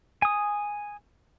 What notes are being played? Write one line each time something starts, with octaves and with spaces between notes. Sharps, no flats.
G#5 D#6